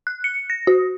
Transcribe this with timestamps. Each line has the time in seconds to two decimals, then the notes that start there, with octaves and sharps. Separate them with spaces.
0.07 F#6
0.24 C#7
0.50 A#6
0.67 F#4